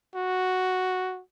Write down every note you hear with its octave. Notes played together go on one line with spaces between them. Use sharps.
F#4